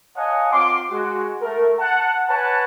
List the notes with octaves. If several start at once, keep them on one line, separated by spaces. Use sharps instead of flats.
C#5 D#5 F5 F#5 G#5 A5
C4 F4 C6 D6
G#3 F#4
A3 A#4
F#5 A5
B4 C#5 F#5 G#5 A5